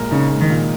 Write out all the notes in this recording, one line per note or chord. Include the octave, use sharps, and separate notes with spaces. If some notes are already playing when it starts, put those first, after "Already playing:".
Already playing: A#2 G#3 A#4
C#3 D#4
G#3
D#3
A#2